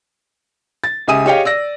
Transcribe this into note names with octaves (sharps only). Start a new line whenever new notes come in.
A6
C#2 G4 E5 G#5 D#6 D#7
G4 G#4 C#5 D#5 F5 G5
D5 E6 A#6